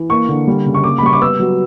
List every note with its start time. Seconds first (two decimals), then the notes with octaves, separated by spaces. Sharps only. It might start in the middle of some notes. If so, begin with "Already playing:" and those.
Already playing: E3
0.10 A#3 C#6
0.29 D3
0.47 G3
0.66 C#3
0.74 C#6
0.84 A#3 D6
0.98 B5
1.03 G3 C#6
1.13 D6
1.21 B3 E6
1.40 F#3